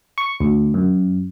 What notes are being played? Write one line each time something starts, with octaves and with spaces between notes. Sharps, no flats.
C#6
D2
F#2